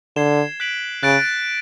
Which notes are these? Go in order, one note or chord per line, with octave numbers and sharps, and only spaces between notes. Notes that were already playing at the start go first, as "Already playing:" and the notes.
D3 G#6 C7 E7 G7
F#6 B6 D7 F#7
C#3 F#6 A6 D7